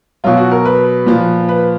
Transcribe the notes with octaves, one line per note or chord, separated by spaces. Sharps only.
B2 F#3 F4
F#4
A#4
B4
A#2 F3
B4